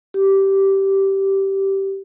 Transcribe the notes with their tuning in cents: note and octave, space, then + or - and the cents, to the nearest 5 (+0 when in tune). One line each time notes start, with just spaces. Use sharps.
G4 -10